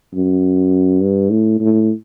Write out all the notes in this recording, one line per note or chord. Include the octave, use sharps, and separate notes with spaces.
F#2
G2
A2
A2